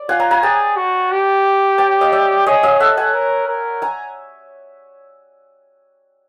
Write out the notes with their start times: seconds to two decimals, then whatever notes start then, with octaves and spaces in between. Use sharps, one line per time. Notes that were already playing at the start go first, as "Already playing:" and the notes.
Already playing: D5
0.09 F4 F#5 G#5
0.20 G#5 A#5
0.31 G#5 A#5
0.42 G#4 G5 A5
0.76 F#4
1.11 G4
1.78 G5 A5
2.01 D#5 F5
2.12 D5 E5
2.46 G#4 C#5 D#5
2.63 D#5 F5
2.80 A4 E5 F#5
2.97 F#5 G#5
3.14 A#4
3.48 A#4
3.82 G#5 A#5